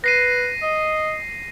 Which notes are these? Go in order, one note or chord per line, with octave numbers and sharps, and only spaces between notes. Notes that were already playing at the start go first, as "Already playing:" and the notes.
B4 A#6 C7 D#7
D#5